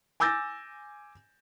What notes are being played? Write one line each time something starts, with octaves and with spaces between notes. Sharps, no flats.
G#5 D6 E6 G6 A6 A#6